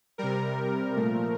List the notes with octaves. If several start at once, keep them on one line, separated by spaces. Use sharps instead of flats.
C3 G3 A#4
A#2 F3 A3 A#4